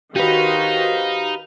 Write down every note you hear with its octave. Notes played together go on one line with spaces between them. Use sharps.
D#3 D#4 F#4 G4 B4 C5 F5